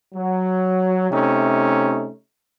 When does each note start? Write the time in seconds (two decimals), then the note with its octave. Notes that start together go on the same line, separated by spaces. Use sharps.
0.14 F#3
1.11 C3 A3 C#4 D#4